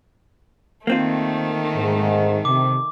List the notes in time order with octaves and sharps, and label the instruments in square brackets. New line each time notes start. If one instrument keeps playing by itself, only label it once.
[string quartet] D#3 A3 [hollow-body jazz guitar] A#3 C4 F4
[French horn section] G#2
[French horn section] C3 [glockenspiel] D6